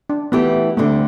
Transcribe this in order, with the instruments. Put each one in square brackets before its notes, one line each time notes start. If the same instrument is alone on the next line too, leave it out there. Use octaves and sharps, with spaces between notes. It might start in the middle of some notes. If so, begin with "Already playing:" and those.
[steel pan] D4
[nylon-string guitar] E3 A3 E4 G4 [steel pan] B3
[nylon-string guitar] D2 D3 G3 C4 [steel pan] A3